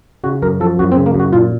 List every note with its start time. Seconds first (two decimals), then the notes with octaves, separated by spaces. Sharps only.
0.24 C#3 F#4
0.42 F#2 A#4
0.60 F3 A4
0.79 F#2 F#4
0.92 C4
0.96 C#3
1.06 A#3
1.15 F#2
1.20 F#4
1.32 A#2 F4